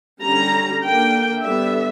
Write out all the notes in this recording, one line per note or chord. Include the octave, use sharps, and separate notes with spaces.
D3 G3 C#4 A#5
D3 A#3 D4 G5
D3 G3 B3 E5